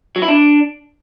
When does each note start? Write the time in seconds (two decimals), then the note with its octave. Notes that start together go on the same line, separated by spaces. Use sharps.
0.16 F#3
0.22 E4
0.28 D4